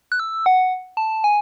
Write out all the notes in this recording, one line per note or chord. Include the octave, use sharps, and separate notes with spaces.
F#6
E6
F#5
A5
G#5